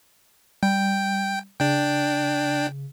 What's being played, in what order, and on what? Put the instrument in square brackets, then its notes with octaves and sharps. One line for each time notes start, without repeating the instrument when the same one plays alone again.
[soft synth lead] G3 [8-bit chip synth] G5
[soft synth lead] C#3 [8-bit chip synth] D4 G5